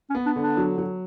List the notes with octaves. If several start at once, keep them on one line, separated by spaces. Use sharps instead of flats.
C#4
B3
D4
D3
D4
F#3
F#3